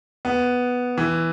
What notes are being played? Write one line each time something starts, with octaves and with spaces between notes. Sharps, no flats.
B3
E3